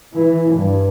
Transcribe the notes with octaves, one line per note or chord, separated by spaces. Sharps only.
E3
G2